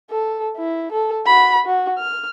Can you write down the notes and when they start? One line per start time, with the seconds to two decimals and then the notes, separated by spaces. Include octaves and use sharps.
0.10 A4
0.57 E4
0.92 A4
1.26 F#4 B5
1.66 F#4
1.98 F6